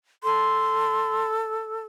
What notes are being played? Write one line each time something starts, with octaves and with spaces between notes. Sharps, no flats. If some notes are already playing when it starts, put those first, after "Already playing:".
A4 C6